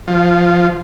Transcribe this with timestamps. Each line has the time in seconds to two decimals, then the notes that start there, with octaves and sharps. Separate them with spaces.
0.08 F3